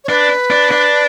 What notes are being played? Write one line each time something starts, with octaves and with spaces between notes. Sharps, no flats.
C#5
D4 B4
D4
D4